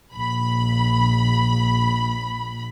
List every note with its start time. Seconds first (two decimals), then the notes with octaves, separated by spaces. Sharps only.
0.15 A#1 B5